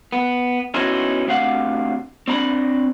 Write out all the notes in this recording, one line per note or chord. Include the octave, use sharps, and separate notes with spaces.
B3
B3 C#4 D#4 E4 F#4 C5
D2 C3 F5 F#5
C4 D4 A#5 B5